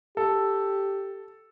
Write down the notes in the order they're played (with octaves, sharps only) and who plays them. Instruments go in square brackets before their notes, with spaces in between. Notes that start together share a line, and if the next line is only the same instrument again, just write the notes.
[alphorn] G4 [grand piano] A4